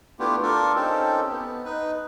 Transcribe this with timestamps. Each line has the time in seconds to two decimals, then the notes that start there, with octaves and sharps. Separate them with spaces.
0.19 A3 B3 D4 E4 F4 G4
0.43 D4 F4 A4 A#4
0.76 C4 C#4 D#4 G4 A4
1.30 B3
1.65 D#4 B4